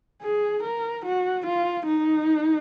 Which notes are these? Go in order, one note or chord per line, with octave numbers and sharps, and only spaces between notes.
G#4
A#4
F#4
F4
D#4